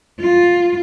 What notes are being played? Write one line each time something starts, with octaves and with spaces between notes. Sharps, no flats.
F4